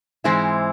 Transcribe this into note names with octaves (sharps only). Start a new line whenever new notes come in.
G#2 E3 G#3 C4 E4